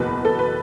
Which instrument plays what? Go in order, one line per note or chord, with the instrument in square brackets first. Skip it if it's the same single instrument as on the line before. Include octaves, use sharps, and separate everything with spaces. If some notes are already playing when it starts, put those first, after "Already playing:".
Already playing: [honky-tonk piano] F#1 E2 B2 F#3 B4
A4
B4